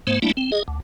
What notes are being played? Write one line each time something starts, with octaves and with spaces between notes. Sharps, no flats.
G#2 A3 B3 C5
G3 A3 A#3 D4 E4
C4
G#4 D#5
D2